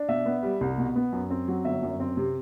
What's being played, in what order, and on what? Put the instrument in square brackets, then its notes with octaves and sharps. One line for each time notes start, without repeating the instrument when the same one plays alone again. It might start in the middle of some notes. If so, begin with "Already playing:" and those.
Already playing: [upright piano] D4
B2 E5
B3
G3
C2
B2
B3
F#2
C4
F#3
G1 E5
F#2
C4
C3